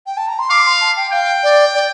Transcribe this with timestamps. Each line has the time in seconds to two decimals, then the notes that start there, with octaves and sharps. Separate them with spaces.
0.06 G5
0.17 A5
0.28 A#5
0.39 C6
0.50 F5 D6
0.66 C6
0.81 A5
0.96 G5
1.12 F5 G5
1.43 D5
1.74 D5